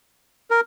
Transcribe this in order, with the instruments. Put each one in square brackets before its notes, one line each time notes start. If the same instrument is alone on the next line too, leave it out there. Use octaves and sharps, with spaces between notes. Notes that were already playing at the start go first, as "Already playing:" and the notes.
[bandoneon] A#4